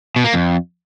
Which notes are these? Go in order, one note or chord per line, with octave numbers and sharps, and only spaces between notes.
B2
A#3
F2